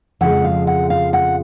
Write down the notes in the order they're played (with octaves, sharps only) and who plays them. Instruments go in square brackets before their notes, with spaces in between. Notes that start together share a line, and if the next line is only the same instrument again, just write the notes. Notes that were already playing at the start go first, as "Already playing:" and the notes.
[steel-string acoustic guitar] F2 C#3 F3 G#3 F#5
F5
F#5
F5
F#5